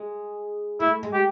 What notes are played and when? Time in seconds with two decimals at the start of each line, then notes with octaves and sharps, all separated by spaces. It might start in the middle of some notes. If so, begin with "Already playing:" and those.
Already playing: G#3
0.80 A3 E4
1.03 G#3
1.13 G4